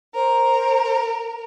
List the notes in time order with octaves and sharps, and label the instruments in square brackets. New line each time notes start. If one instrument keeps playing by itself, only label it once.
[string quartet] A#4 [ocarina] C5